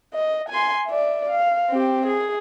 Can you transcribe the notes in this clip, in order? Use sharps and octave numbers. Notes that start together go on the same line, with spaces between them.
D#5
G#5 C6
D5 E5
F5
C4 G4
G#4